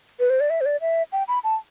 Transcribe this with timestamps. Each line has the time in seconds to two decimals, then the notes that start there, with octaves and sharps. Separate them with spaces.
0.20 B4
0.30 C5
0.40 D5
0.50 E5
0.61 C5
0.66 D5
0.81 E5
1.12 G5
1.28 B5
1.44 A5